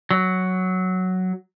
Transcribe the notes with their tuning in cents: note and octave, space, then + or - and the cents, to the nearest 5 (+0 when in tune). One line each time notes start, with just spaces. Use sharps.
F#3 +5